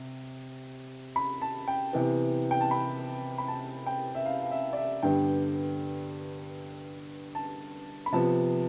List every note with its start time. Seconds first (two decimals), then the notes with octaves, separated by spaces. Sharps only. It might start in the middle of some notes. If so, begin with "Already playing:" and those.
Already playing: C3
1.16 B5
1.42 A5
1.68 G5
1.93 C3 E3 B3
2.51 G5
2.61 A5
2.71 B5
3.38 B5
3.48 A5
3.86 G5
4.15 E5
4.25 F5
4.42 F5
4.51 E5
4.73 D5
4.77 E5
5.03 G2 D3 G3 B3 G5
7.35 A5
8.06 B5
8.12 C3 F3 B3 A5